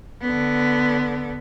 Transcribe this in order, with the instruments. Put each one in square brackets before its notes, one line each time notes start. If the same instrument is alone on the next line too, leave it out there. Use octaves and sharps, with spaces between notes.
[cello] D3 B3